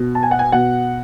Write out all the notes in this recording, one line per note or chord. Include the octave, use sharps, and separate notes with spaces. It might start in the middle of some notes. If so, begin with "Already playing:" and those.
Already playing: B2
A5
G#5
F#5
G#5
B2 F#5